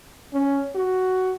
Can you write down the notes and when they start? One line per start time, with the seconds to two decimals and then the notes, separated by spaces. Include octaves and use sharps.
0.34 C#4
0.75 F#4